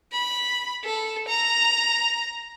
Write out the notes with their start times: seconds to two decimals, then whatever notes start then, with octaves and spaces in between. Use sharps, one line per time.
0.12 B5
0.84 A4
1.28 A#5